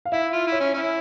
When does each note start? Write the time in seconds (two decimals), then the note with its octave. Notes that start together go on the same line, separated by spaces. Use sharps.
0.05 F5
0.12 E4 E5
0.33 F4
0.47 E4
0.52 C#5
0.60 C#4
0.74 C#4 E4